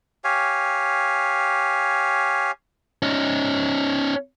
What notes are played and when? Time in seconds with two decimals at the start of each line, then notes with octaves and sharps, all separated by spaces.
0.24 G4 C#5 F5 G#5
3.02 C#4 D#4